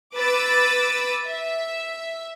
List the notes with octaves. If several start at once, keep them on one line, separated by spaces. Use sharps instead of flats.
B4 D6 E6 A6
E5